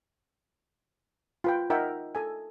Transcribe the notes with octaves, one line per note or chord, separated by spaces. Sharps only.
F4 B4 G5
D#4 A#4 D#5 E5 F#5 G5
A4 G#5